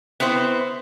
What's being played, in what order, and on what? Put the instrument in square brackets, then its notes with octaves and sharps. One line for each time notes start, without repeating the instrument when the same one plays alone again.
[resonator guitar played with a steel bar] B3 C4 E4 C5